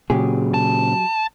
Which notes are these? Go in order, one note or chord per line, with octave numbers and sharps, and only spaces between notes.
A#2 C#3 F#3 G4 G#4
A5